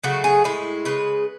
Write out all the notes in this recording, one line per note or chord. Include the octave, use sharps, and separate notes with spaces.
C#3 F#3 A3 F#4
G#4
A2 G#3 E4
C#3 G#3 B4